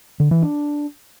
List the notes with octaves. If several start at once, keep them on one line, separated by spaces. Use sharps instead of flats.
D3
E3
D4